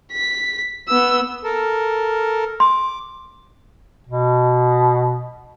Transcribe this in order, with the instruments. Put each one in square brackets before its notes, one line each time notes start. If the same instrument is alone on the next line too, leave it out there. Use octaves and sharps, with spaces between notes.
[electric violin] B6
B3 E6
[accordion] A4 A#4
[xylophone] C6 [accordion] D6
[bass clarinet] B2